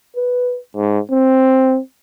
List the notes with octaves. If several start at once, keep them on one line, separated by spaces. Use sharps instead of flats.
B4
G#2
C4